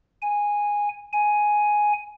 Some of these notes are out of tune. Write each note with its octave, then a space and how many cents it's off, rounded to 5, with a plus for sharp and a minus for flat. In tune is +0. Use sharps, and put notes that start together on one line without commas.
G#5 -10
G#5 +5